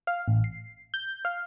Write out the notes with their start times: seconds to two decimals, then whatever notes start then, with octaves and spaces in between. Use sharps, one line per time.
0.07 F5
0.28 A1
0.44 C7
0.94 G6
1.25 F5